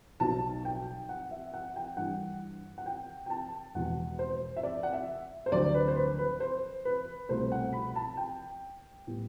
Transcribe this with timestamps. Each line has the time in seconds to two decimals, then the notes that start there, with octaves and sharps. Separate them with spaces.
0.20 B1 B2 F#3 A5
0.65 G5
1.09 F#5
1.31 E5
1.54 F#5
1.76 G5
1.97 G2 E3 G3 F#5
2.78 F#5
2.86 G5
3.26 G5
3.30 A5
3.74 E1 E2 B2 F#5
4.19 C5
4.57 E5
4.63 D5
4.83 F#5
4.93 E5
5.46 C5
5.52 D2 D3 F#3 D5
5.74 B4
5.88 C5
5.96 B4
6.19 B4
6.40 C5
6.85 B4
7.29 C2 B2 A3 C5
7.52 F#5
7.73 B5
7.96 A5
8.17 G5
9.07 A2 G3 B3